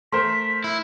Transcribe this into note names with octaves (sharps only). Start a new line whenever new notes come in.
A3 A#4 C5 C6 B6
E4